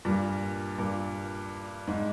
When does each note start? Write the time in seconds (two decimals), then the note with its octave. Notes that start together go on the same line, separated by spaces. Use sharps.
0.05 G2 A#2
0.78 G2 A#2
1.88 G#2